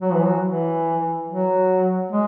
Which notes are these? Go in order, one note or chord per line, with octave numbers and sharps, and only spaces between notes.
F#3
E3
F#3
E3
F#3
G#3